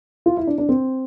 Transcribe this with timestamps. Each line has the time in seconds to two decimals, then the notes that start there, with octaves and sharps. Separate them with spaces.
0.26 F4
0.37 E4
0.47 D4
0.58 D4
0.69 C4